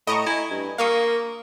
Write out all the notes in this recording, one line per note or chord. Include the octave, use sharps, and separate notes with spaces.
A2 D#5 A#5 C#6
E4 G#5
G2
A#3 F5 C#6 D#6